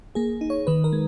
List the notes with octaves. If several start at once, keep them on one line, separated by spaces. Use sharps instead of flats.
A#3 G#4
D#4
C#5
D#3 B4
A#4
G#3